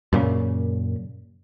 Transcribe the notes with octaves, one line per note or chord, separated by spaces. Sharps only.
F#2 A#2 C#3